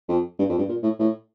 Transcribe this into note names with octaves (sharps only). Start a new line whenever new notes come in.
F2
G2
F2
G2
A#2
A2
A2